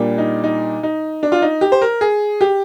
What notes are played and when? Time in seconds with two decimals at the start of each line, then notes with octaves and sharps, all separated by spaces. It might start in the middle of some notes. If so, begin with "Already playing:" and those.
Already playing: A#2 G3 A#3 D4
0.18 D#4
0.44 D#4
0.83 D#4
1.23 D4
1.32 F4
1.42 D#4
1.61 G4
1.72 C5
1.81 A#4
2.01 G#4
2.41 G4